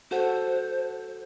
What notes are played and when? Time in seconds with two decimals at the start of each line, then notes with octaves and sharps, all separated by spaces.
0.11 F#4 A4 C5 F#5